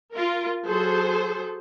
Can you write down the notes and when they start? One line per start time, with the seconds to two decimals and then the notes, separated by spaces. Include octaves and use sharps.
0.12 F4 A#4
0.67 F#3 G#4 A4 C5